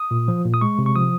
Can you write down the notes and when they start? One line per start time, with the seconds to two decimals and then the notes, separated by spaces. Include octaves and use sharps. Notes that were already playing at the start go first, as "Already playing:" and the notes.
Already playing: D#6
0.11 A#2
0.28 F3
0.45 A#2
0.54 D#6
0.61 G#3 C#6
0.79 C3
0.86 C#6
0.95 F3 D#6